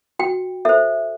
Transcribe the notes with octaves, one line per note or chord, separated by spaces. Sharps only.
F#4 G5
A4 C5 E5